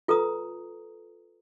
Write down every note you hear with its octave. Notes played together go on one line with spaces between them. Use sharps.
F4 A4 B4 A#5 D#6